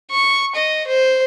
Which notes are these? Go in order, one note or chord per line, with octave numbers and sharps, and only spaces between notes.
C#6
D#5
C5